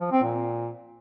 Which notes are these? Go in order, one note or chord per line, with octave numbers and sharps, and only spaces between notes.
F3
C4
A#2